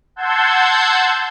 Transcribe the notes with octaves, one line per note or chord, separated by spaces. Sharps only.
F#5 A5 C6 E6 G6 G#6